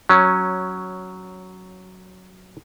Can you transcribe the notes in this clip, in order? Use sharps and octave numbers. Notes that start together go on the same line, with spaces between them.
F#3 C#4